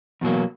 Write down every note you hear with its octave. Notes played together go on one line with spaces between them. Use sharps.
E2 B2 F#3 A#3